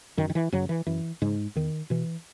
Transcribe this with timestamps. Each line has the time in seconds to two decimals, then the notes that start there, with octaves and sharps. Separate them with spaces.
0.17 F#2 D#3
0.30 D#3
0.35 E3
0.52 F#2 C#3 F#3
0.69 E3
0.86 F#2 E3
1.22 G#2 C#3 G#3
1.55 E2 D#3
1.90 B2 E3